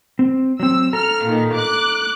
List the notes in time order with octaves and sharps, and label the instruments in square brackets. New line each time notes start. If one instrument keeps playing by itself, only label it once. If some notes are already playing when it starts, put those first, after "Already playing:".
[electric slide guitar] C4
[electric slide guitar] F#3 C4 [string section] E6
[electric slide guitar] A4 A#5 [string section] F6
[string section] A#2 D#3
D6 F#6